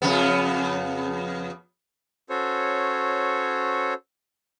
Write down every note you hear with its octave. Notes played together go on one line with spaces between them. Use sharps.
F2 C#3 B3
C#4 F#4 A4 C5 C#5